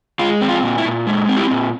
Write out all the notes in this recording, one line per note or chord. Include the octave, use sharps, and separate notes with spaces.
G#3 F4
C4
F4
A#2
E4
A#2
G#3
C4
E4 G4
A#2